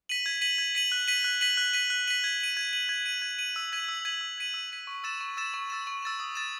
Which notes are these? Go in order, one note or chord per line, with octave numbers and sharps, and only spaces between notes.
B6 D#7 F#7
G#6
B6 D#7 F#7
G#6
B6 D#7 F#7
F#6
B6 D#7 F#7
F#6
B6 D#7 F#7
F#6
B6 D#7 F#7
F#6
B6 D#7 F#7
G#6
D#7 F#7
G#6
D#7 F#7
G#6
D#7 F#7
G#6
D#7 F#7
E6
G#6 B6 D#7 F#7
E6
G#6 B6 D#7 F#7
E6
G#6 B6 D#7 F#7
E6
G#6 B6 D#7 F#7
C#6
E6 A6 E7
C#6
E6 A6 E7
C#6
E6 A6 E7
C#6
E6 A6 E7
D#6
A6 E7